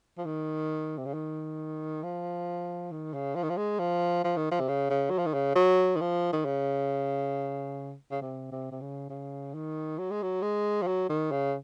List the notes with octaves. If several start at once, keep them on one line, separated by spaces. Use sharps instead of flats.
F3
D#3
C3
C#3
D#3
F3
D#3
C#3
F3
D#3
F3
G#3
F3
F3
D#3
F3
C3
C#3
C#3
F#3
F3
D#3
C#3
F#3
D#3
F3
D#3
C#3
C#3
C3
C3
C3
C#3
C#3
D#3
F#3
G#3
F#3
G#3
F3
F#3
D#3
C#3